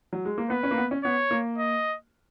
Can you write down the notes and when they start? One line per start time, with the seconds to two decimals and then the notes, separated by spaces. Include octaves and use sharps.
0.13 F#3
0.25 G#3
0.38 A#3
0.50 B3 B4
0.63 C#4
0.71 A#3
0.78 B3
0.91 C#4
1.04 B3 C#5
1.31 A#3
1.58 D#5